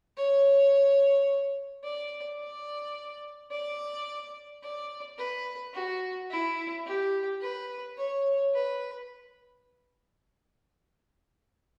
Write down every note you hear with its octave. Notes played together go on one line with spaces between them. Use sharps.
C#5
D5
D5
D5
D5
B4
F#4
E4
G4
B4
C#5
B4